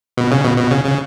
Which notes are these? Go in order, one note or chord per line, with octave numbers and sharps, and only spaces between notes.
B2
C#3
B2
B2
C#3
C#3